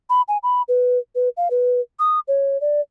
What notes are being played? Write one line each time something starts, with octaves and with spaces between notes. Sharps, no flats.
B5
G#5
B5
B4
B4
F5
B4
D#6
C#5
D5